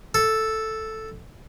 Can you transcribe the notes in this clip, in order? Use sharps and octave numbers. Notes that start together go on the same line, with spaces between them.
A4